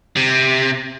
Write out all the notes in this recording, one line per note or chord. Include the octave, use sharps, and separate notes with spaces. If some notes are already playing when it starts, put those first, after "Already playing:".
C3